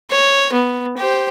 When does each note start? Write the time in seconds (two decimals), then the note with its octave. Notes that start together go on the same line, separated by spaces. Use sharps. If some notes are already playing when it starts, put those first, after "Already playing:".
0.10 C#5
0.52 B3
0.97 G4 C5